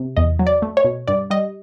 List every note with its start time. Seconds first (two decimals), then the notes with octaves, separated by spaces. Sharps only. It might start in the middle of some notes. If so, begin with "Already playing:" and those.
Already playing: C3
0.17 E2 D#5
0.39 F#3
0.47 D5
0.62 A3
0.77 C#5
0.84 B2
1.08 G2 D5
1.30 G3 D#5